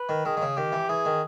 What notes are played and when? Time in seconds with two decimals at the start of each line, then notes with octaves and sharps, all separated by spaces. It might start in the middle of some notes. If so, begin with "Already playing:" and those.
Already playing: B4
0.09 D#3
0.25 D#3 G#4
0.37 D#3
0.42 C#3
0.57 D#3 G4
0.72 E3
0.89 E3 G#4
1.05 D#3